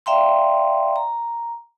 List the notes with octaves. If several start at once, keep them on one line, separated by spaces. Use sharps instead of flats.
D5 E5 F5 G5 A#5 C6
A#5